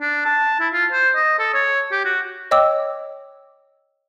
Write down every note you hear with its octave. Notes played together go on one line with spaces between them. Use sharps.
D4
A5
E4
F4
C5
D#5
A4
C#5
G4
F#4
C#5 D#5 G5 D6 E6